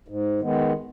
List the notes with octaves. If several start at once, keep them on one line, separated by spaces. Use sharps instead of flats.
G#2
D#3 G#3 B3